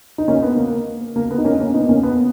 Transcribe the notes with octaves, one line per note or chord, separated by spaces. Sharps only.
D#4
A#3 C#4
B3
A#3
A#3
B3
D#4
A#3 C#4
A#3 C#4
B3 D#4
A#3 C#4
B3